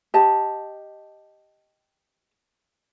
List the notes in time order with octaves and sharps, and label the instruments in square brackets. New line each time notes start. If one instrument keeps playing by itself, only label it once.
[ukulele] G4 D#5 A5